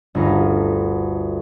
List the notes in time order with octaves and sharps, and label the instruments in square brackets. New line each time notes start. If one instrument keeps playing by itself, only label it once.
[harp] G1 D2 A#4